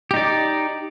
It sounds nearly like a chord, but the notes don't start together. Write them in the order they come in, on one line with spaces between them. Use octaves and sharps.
G4 D#4 D5